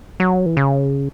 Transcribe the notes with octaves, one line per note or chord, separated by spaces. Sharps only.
F#3
E3
C#3